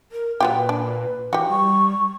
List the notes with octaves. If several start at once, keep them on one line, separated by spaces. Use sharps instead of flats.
A#4
A#2 F#3 F4 G4 B4
D4
E3 F#4 G4
G3 C#6